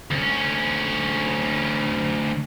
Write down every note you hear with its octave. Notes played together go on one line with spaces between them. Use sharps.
D2 C#4